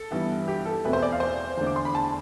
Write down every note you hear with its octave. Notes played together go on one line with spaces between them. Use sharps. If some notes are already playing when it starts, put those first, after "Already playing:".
Already playing: A4
G2 E3 B3 E4
G4
A4
E2 B2 A3 C4 E4 B4
C5
D5
F5
C5
E2 D3 A3 D4
D6
C6
B5
A5